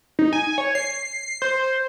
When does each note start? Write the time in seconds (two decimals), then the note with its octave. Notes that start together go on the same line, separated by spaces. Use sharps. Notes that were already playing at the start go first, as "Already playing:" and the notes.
0.19 D#4
0.33 G#5
0.58 C#5
0.75 C7
1.42 C5